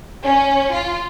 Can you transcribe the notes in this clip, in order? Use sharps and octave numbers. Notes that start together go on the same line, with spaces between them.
C#4
F4